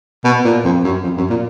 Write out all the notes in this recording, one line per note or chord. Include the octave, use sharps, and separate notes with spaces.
B2
A#2
F2
F#2
F2
F#2
A#2